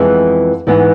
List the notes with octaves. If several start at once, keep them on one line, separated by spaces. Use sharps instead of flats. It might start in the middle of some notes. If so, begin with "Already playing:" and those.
Already playing: F2 E3 G#3 B3
G#2 E3 B3